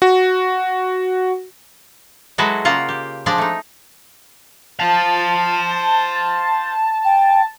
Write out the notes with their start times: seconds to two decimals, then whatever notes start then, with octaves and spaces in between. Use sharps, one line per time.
0.02 F#4
2.38 F#3 G#3 E4 F#4 A4 B4
2.65 C#3 A#3 F4 F#5
2.89 G4
3.26 F3 G#3 D4 D5
3.38 A3 D#4
4.79 C5 F5 A5
7.05 G5